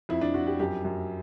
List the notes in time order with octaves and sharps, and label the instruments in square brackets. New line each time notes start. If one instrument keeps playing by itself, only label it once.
[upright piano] F2 E4
D4
F2 F#4
G4
F#2 G4
F#2